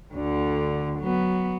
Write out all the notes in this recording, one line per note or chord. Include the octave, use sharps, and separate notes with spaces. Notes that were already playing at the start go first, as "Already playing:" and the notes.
D2 D3
F#3 B3